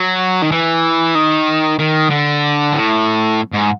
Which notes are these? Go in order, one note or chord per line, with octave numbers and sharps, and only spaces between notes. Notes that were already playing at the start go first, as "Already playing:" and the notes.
Already playing: F#3
D#3
E3
D#3
D#3
D3
A2
G#2